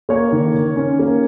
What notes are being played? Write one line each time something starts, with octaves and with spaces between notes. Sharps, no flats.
A#3 C#5
D#3
D#3
C#4
A#3